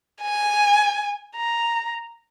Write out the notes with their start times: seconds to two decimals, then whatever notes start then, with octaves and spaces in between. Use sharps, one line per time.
0.22 G#5
1.36 A#5